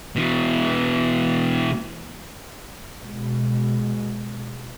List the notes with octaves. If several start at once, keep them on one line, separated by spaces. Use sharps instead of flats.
B2 E3
B2 G#3